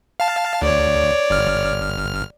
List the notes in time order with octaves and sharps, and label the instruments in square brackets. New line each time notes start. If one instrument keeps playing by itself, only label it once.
[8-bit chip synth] F5 A5
[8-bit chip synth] D2 [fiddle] C#5 D5
[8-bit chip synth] G1 F6